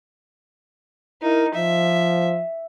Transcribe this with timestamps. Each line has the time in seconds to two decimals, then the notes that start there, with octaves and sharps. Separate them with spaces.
1.22 D#4 E4 A#4
1.54 F3 E5